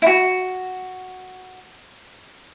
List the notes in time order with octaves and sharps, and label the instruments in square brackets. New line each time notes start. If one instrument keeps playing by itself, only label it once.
[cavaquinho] E4 F#4